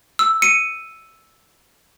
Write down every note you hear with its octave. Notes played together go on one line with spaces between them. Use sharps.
E6
C#7 D#7